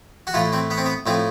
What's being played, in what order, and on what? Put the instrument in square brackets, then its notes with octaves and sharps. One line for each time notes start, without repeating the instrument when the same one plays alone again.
[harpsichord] F#4
A2 E3 F4
C4
B3
C4
B3
A2 F3 C4